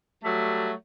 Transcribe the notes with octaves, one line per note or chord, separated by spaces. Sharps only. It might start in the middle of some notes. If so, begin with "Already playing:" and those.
F#3 G3 A3